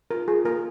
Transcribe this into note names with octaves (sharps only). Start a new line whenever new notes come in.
F4 A#4
F4 G#4
A#3 A#4